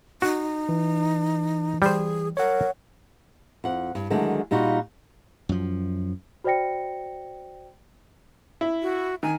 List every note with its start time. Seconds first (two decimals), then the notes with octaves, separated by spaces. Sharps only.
0.22 D#4 F#4
0.69 E3
1.82 G3 G#4 C5
2.37 A#4 C#5 F#5
3.64 F2 F#5
3.95 G2
4.10 D3 D#3 F#3 G#3 A3 D4
4.51 A#2 G3 D#4 F4 F#4
5.49 F#2 F3
6.44 F#4 C5 D5 G5 A#6 C#7
8.61 E4
8.82 F#4
9.23 D#3 G#5